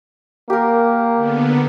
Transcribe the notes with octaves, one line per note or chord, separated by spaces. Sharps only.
A#3 G4 A#4
D3 B3